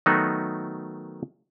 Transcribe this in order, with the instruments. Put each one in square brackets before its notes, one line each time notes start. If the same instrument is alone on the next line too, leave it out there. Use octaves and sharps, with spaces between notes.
[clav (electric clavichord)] D#3 F#3 A3 B3 D#4 F#4